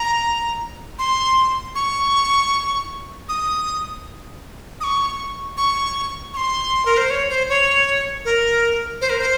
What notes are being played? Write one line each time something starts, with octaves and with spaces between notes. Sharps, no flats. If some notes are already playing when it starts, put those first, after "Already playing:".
Already playing: A#5
C6
C#6
D#6
D#6
C#6
C#6
C#6
C6
A#4
C5
C#5
C5
C#5
A#4
C5
A#4
C5